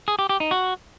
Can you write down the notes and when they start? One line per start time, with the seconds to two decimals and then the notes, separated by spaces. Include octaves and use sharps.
0.08 G#4
0.19 G4
0.29 G4
0.40 D#4
0.51 F#4